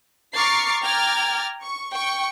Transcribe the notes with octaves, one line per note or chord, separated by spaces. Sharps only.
A#5 C#6 D6 F6 A6 C7
G5 A#5 D6 F6 G#6 A6
C#6
G5 C#6